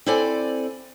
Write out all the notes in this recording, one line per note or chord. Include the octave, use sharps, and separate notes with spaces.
C4 E4 A4 C5 D5 G#5